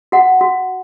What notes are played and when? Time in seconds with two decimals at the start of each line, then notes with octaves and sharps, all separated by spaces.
0.12 F#4 F#5
0.41 F#4